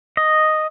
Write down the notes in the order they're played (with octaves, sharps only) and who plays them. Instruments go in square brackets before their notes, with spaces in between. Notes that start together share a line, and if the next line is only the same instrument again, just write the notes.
[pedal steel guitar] D#5